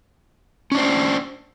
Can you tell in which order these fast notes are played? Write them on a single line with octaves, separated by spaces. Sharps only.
C#4 D4 C5